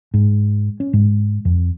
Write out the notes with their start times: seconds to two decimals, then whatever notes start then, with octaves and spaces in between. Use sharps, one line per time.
0.14 G#2
0.80 C#4
0.93 G#2
1.45 F2